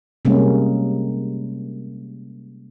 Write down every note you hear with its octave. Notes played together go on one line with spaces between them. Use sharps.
C3 G3 G#3 A#3 C#4